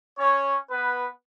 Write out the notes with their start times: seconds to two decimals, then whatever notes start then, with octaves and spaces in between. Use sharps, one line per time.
0.18 C#4 C#5
0.70 B3 B4